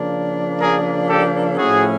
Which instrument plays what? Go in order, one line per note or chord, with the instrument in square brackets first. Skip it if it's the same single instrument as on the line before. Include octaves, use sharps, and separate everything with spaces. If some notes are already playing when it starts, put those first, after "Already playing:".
Already playing: [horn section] C#3 F3 A#3 D4
G#4 A#4
G4 A4
A2 F3 A3 C#4 E4 F#4 G#4